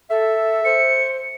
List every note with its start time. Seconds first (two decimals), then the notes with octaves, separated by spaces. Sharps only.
0.10 A4 E5
0.65 C5 C#7